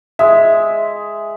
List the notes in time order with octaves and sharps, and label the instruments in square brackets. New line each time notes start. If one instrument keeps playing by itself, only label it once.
[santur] G#3 [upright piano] E5